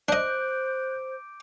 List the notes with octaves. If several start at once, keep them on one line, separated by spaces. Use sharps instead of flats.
D4 C5 D#5 D6 F#6 G6 D7